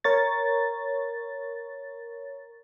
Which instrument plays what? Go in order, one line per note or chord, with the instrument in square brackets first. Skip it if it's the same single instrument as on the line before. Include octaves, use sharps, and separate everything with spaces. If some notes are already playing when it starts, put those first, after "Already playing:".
[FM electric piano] A#4 C#5 A6